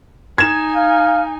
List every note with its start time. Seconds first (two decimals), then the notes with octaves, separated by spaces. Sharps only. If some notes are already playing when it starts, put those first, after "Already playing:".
0.38 D#4 G#5 G#6 E7
0.76 F5